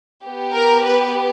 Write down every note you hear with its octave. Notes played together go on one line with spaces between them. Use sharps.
B3 G4
A#4
B4